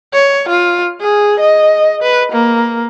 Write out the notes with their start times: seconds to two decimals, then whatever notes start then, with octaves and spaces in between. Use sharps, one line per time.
0.13 C#5
0.49 F4
1.01 G#4
1.40 D#5
2.03 B4
2.32 A#3